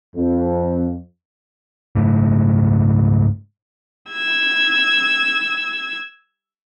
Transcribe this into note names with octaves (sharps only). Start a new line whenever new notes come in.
F2
G#2 C#3 A3
E6 G#6